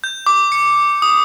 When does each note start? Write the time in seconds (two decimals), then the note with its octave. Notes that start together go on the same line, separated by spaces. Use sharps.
0.04 G6
0.26 D6
0.52 C#7
1.02 D#6